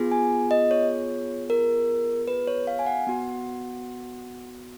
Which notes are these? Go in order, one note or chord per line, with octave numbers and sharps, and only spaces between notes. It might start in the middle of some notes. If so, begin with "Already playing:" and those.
Already playing: B3 F4 G#4
G#5
D#5
C#5
A#4
B4
C#5
F5
G#5
F#5
B3 F#4